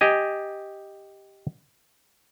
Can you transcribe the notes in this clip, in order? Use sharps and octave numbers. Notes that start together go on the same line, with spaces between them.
G4 D#5 G#5